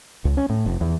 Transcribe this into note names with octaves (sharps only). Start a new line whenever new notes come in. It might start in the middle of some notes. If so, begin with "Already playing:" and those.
C#2
C#4
A2
F1
E2